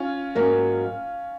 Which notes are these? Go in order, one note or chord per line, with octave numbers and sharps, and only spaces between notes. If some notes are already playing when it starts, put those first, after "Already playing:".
Already playing: C#4 F4
G#2 F#3 A#3 C#4